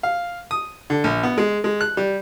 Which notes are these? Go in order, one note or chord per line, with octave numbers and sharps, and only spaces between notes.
F5
D#6
D3
A#1
B3
G#3
G#3
F#6
G3